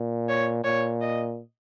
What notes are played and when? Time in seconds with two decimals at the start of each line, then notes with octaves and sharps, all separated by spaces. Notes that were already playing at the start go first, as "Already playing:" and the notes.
Already playing: A#2
0.29 C#5
0.64 A#2 C#5
1.01 D#5